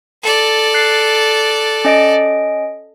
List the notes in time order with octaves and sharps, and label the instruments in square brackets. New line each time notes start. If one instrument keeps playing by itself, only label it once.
[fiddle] A4 D5
[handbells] F#6 C7
C#4 D#5 D7